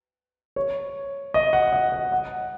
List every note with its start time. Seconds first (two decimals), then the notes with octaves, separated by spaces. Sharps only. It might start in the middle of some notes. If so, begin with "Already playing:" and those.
0.56 C#5
1.34 D#5
1.53 F#5
1.72 D#5
1.92 F#5
2.12 F#5